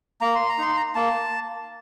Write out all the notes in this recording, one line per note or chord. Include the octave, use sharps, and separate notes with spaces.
A#3 A#5
C6
A#5
D#4 C6
A#5
A#3 A5